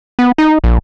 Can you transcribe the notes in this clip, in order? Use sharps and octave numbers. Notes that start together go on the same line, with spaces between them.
B3
D#4
A#1